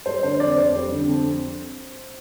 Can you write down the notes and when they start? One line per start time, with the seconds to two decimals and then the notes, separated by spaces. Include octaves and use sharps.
0.06 G3 C5
0.23 D3 C5
0.40 F2 D5
0.58 F2 C5
0.75 G3
0.92 D3
1.09 F2